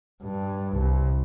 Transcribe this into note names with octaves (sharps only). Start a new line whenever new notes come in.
G2
C2